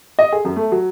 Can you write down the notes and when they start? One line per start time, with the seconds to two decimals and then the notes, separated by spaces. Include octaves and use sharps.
0.19 D#5
0.32 G#4
0.45 F#2
0.56 A3
0.72 F#3